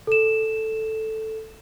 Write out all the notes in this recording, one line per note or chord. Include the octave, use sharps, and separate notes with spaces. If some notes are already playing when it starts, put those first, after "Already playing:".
A4 E7